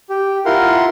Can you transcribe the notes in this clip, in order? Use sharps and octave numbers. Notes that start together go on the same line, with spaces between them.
G4
E4 F4 A#4 F#5 C6